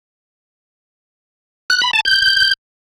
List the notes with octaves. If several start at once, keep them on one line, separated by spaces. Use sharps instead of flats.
F#6
B5
A5
G6